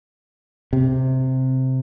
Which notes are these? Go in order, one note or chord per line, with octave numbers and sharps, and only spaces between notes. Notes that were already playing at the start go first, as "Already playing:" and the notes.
C3